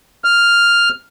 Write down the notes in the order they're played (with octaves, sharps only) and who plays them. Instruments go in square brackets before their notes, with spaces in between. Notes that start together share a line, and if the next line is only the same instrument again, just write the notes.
[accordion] F6